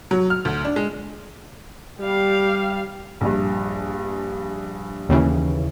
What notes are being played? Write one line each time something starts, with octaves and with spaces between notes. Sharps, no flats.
F#3
F6
D2
D4
G#3
G3 G4 F5
A#1 G2
D#2 C#3 E3